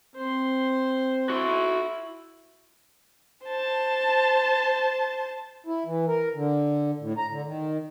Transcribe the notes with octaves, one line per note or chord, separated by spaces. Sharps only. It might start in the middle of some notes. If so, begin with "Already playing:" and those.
C4 C5 C6
E4 F#4 C6
C5 A5
E4
E3
A#4
D3
A2
A#5
D3
D#3